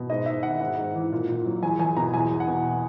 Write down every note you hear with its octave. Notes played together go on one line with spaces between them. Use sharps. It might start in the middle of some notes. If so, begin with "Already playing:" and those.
Already playing: B2
G#2 D#5
G#2 E5
D#3 F#5
G#2 F#5
G#2
E3
A#2
A#2
F#3
E2 G#5
E2 G#5
B2 A#5
E2 G#5
E2
F#5
B2